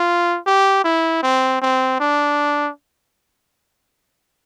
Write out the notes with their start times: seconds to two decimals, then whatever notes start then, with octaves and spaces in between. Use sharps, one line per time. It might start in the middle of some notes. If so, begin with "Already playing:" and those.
Already playing: F4
0.46 G4
0.84 E4
1.22 C4
1.62 C4
2.00 D4